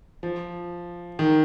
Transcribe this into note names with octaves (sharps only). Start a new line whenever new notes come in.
F3
D#3